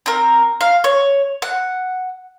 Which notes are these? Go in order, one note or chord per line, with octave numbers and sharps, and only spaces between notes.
C4 A#4
F5
C#5
F#5